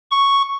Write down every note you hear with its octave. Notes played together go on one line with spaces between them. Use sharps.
C#6